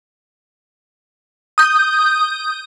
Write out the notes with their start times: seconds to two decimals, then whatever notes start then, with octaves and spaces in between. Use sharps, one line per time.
1.58 D#6 G6